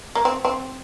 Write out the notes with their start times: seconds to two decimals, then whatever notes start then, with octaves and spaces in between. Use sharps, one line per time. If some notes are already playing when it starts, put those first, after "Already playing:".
0.15 A#3
0.25 C4
0.45 C4